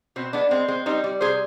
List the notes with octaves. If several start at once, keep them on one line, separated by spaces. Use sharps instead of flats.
B2 C4
G#3 B3 D4
G#3 C4
G#3 C4
G3 C4 D#4
G3
C3 G#4 C5